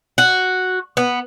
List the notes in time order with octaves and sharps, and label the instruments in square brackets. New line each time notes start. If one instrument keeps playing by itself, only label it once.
[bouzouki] F#4
B3